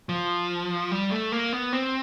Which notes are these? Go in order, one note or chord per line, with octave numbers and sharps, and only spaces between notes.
F3
G3
A3
A#3
B3
C4